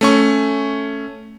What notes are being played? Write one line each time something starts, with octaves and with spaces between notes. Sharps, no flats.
A3 C#4 C#6